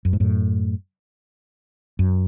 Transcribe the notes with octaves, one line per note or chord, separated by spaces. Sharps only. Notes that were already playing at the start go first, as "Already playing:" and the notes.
F#2
G#2
F#2 A2
F#2